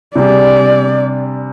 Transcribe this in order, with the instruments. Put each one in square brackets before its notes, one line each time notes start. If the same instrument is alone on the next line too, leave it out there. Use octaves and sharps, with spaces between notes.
[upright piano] C3 G3 D4 G#4 [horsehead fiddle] D5